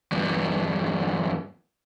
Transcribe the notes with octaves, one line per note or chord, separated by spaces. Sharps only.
E2 G2